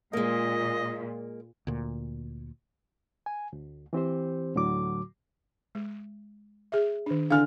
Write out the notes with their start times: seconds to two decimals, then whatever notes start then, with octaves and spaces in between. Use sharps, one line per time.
0.13 A#2 G#3 A#3 D#5
1.67 D2 A#2
3.26 G#5
3.53 D2
3.93 E3 C4 G4 C5
4.55 D2 A2 D3 F#3 F#4 D6
5.75 G#3
6.72 G#4 E5
7.06 D#3 D4
7.30 D3 F5 G#5 F6